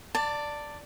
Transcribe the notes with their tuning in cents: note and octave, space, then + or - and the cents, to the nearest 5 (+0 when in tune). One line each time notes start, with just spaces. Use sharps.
D5 +0 A5 +25